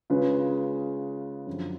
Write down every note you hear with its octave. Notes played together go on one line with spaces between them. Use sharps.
C#3 G#3 C#4 F4 B4
F#2 D3 F3